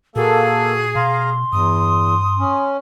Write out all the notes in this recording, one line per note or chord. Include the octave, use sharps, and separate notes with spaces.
A#2 A#3 F#4 G#4 A4
B2 F5 A#5 C6
E2 G2 D#6
C#4